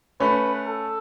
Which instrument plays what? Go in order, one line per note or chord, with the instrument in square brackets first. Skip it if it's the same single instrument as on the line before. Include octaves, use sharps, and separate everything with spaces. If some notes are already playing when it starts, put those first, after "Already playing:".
[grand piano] A3 C#4 [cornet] B4
[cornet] A4